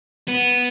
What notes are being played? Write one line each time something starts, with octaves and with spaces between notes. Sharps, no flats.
B3